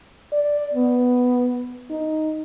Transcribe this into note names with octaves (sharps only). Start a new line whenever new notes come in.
D5
B3
D#4